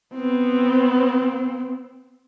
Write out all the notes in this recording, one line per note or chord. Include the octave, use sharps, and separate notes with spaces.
B3 C4